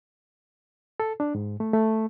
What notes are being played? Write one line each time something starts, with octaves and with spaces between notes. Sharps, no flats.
A4
D4
G#2
A3
A3